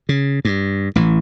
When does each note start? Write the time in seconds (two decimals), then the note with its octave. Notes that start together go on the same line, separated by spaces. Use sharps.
0.09 C#3
0.45 G2
0.96 A1 E3